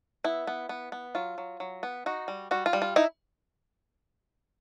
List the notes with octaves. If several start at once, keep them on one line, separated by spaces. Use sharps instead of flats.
B3 E4
B3
B3
B3
F#3 F4
F#3
F#3
B3
D#4 F#4
G3
G3 F#4
F4
G3
F4
D#4 E4